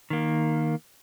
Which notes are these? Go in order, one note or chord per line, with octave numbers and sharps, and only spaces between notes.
D#3 A#3